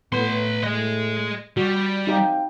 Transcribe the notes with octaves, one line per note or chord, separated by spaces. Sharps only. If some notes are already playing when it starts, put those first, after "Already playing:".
A2 B3 B4 C6
G#4 D#5
G3 F#4
C4 D#4 G4 F5 G5